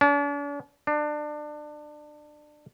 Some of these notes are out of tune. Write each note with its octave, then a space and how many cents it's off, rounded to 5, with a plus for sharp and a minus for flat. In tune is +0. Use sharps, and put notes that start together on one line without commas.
D4 -45
D4 +25